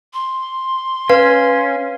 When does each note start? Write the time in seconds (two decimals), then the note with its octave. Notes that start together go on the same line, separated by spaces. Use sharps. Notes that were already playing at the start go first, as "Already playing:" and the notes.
0.13 C6
1.10 C#4 B4 F5